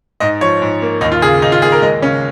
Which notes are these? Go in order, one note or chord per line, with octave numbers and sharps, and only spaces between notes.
G#2 D#5
F3 C#5
G#2
A#3
D#2 D#4
F4
C#3 G#4
D#2 D#4
F4
A#3 G#4
A#4
G#3 D#5
C#3 C#4